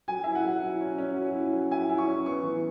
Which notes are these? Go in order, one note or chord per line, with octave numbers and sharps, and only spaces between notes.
F#3 G#5
E4 E5
F#5
F#3
E4
C#4
C#4
F#3
E4
F#3
E4 G#5
E4
C#6
C#4
B3 C#6
E3